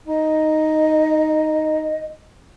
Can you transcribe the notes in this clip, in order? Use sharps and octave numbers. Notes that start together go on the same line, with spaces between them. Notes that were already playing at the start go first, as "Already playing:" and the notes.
D#4 D#5